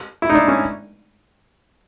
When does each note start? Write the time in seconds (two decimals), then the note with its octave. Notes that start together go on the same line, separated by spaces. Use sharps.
0.22 E4
0.30 D#4
0.35 D4
0.48 C#4